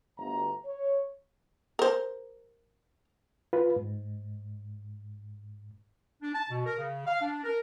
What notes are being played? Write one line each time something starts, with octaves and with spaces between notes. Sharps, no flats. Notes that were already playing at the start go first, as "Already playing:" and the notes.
G1 D2 A#5
C#5
A#4 C5
F4 B4
G#2
D4
A5
B2
A#4
C#3
F5
D4
A#4